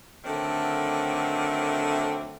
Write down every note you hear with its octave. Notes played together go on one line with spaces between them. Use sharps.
D3 D#3 F#3 A3 C4